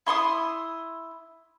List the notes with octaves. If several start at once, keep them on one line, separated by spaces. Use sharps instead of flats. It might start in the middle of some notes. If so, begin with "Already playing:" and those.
E4 C6 C#6 D#6